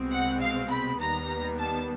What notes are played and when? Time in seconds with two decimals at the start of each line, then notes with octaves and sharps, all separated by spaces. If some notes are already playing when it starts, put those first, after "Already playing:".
Already playing: C2 B2 G#3 C4
0.11 F#5
0.40 F5
0.70 B5
1.00 D#2 D#3 G3 B3 A#5
1.59 A5